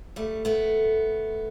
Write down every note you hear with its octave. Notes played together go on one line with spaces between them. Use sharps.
G3 A3
A3 B3